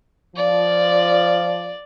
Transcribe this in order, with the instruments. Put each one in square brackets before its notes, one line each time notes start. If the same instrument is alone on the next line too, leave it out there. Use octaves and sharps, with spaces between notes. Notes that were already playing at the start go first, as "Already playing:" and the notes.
[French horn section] F3 [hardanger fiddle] D5